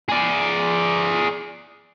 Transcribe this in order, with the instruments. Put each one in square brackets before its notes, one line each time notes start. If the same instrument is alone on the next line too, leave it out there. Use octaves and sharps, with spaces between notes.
[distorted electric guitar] G#4 D5